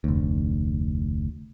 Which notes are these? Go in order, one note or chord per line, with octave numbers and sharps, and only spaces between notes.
F1 D2